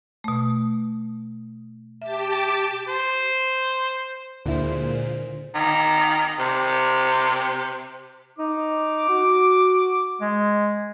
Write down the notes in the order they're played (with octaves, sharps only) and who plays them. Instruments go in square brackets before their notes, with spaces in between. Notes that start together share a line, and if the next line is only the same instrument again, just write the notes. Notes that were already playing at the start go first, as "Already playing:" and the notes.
[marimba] B2 A3
[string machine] G4 A5 D6 [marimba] E5
[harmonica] C5
[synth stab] D2 E4 [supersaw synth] A#2 [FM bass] D3 [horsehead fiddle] G#3 C5
[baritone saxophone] D#3
C3
[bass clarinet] D#4 [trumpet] D6
[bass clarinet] F#4
G#3